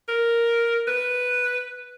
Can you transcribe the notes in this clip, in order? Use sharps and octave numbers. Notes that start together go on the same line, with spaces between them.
A#4
B4